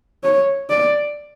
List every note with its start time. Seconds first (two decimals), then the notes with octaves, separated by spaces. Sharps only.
0.24 C#5
0.70 D5